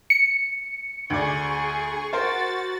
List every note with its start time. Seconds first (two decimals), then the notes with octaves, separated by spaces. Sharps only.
0.10 C#7
1.10 D2 G#4 D5 C#6
2.13 F#4 A#4 C5 A6